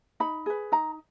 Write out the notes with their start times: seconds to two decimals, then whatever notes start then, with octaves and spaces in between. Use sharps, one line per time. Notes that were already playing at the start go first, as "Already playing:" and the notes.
0.20 D#4 B5
0.46 G#4 B4
0.72 D#4 A#5